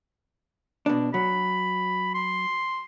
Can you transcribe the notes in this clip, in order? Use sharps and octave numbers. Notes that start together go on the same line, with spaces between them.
B2 D4
F#3 B5
C6